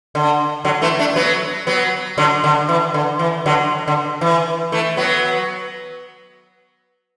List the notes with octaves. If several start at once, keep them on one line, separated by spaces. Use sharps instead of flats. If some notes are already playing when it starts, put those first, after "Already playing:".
D3
D3 F#3
E3 A3
A3 D4
F#3 B3
F#3 B3
D3 F#3
D3
E3
D3
E3
D3 F#3
D3
E3
E3 A3
F#3 B3